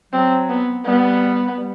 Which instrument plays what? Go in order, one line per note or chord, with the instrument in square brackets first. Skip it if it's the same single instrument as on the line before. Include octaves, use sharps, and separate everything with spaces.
[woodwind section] F#3 [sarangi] C4
[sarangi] B3
[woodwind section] G3 [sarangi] B3
[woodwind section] G3